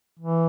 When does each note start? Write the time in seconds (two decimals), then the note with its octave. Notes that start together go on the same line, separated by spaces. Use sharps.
0.19 E3